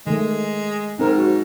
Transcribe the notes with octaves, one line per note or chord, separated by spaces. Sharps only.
D#3 G#3 A3
G#2 C4 A#4
F#4